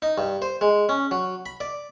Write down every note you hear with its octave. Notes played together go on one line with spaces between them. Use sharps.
D#4
G2
C5
G#3
C#4
F#3
B5
D5